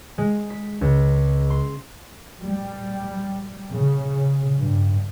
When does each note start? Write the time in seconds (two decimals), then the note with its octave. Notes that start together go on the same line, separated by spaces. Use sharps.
0.18 G#3
0.50 B6
0.81 C#2
1.50 C6
2.42 G3
3.70 C#3
4.58 G2